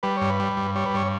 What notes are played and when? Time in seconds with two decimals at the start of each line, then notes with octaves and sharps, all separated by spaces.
0.03 G3 B4
0.17 G2 C#5
0.30 B4
0.40 G3
0.57 G2
0.75 G3 C#5
0.86 B4
0.94 G2 C#5